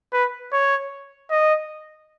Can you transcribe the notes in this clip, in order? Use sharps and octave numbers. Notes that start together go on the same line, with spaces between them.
B4
C#5
D#5